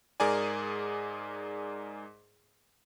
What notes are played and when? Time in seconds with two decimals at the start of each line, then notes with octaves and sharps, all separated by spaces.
0.20 G#2 G#4 A#4 D5 G#5